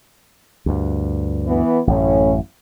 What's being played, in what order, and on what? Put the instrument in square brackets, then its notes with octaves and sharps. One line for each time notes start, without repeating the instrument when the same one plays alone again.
[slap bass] D2 G2
[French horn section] E3 B3
[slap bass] A1 F#2 [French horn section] A2 C#4